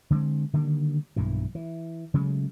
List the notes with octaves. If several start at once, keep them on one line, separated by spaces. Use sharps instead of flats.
D3 G#3 A#3 C4
D3 D#3 G3 A#3
B1 G2 A#2 E3
E3
C#3 F#3 G#3 A3